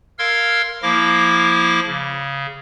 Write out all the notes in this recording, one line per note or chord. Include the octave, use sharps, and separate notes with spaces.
A#4 F5 C6 E6 F6 G#6
F3 A#3 E4 D6 A#6
C#3